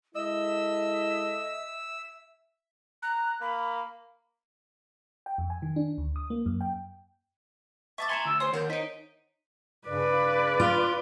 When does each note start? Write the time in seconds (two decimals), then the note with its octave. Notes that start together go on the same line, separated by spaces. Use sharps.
0.15 G#3 E4 A4 D#5 E5 E6
3.03 A#5 F#6
3.41 A#3 B5
5.26 G5
5.38 F2
5.50 G#5
5.62 D#3
5.76 D4
5.98 D2
6.16 D#6
6.30 A#3
6.46 F#2
6.61 G5
7.98 E5 A5 C#6 D6 A6
8.09 E5 G#5 A#5 C6 C#7 E7
8.26 D2 E6
8.40 G#4 C5 C#5 C6
8.54 D#2 A#4 F#5 F6 G6
8.70 D#4 C5 D#5 B6 D7
9.88 G2 C#3 B4 D5
10.60 F4